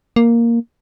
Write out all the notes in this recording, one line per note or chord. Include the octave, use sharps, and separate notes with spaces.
A#3